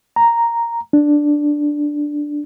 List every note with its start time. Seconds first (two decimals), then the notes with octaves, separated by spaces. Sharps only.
0.16 A#5
0.93 D4